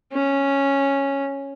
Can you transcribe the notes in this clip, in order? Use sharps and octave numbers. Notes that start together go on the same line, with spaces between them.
C#4